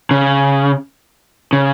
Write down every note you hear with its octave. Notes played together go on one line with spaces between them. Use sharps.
C#3
C#3